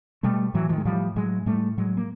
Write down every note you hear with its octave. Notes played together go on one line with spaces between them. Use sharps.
B2 G3 A3
A2 E3 F#3
D#3 F3
G#3
A2 F3 G3
A2 F#3 G#3
A2 G3 A3
A2 F#3 G#3
A#3